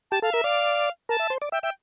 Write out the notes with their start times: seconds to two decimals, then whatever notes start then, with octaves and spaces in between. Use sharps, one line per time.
0.11 G4 A5
0.22 A4 F5
0.33 A#4 E5
0.44 D5 F5
1.09 A#4 A5
1.20 E5
1.30 C5
1.42 D5
1.52 E5 G5
1.62 E5 G5